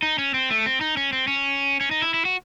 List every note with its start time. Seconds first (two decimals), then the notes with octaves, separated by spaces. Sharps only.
0.02 D#4
0.18 C#4
0.34 C4
0.50 A3
0.66 C4
0.81 D#4
0.97 C#4
1.13 C4
1.28 C#4
1.81 C#4
1.91 D#4
2.02 E4
2.14 E4
2.25 F#4